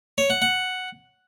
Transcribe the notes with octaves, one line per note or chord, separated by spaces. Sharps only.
C#5
F#5
F#5